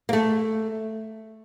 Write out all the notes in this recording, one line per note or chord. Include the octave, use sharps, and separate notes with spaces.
A#3
A3